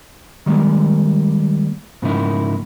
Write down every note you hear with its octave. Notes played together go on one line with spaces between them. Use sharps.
D#3 G3 G#3 A#3
G#2 C#3 F3 A#3 D#4 E4